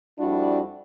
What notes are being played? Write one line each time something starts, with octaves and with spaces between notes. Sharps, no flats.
F2 G3 D4 E4 F#4